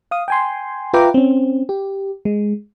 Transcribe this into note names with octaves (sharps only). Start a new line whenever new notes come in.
F5 D#6
G5 G#5 C6
F4 B4 E5 G5 A#5 D6
C4 C#4
G4
G#3